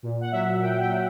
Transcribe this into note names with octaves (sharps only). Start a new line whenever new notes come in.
A#2
F#5
F#3 E5
A#2 G5
G5
F#3